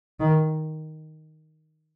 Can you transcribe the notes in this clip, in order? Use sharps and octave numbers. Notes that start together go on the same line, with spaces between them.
D#3